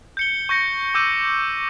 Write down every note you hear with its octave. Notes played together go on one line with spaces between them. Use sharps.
G6 C#7 G7
C#6 G6 A#6 C#7
C#6 D6 E6 G6 D#7